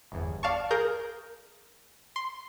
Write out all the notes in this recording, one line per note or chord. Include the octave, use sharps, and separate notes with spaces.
G1 E2
D5 F5 A5 C#6
G#4 A#4 G6
C6